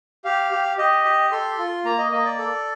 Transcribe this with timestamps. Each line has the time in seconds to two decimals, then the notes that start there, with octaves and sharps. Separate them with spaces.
0.24 G4 F5
0.51 G4
0.78 G4 D#5
1.04 G4
1.32 A4 C6
1.58 F4
1.85 A#3 A#5
1.98 D#5
2.12 A#3 D#5
2.25 D5
2.38 A4